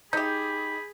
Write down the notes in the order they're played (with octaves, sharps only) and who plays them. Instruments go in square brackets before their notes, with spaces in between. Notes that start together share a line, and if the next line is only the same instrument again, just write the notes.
[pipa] D#4 G4 [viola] G#4 [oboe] B5 [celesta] G6